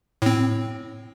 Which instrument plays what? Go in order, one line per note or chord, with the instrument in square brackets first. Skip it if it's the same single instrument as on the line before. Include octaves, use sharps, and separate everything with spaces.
[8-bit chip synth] A2 C4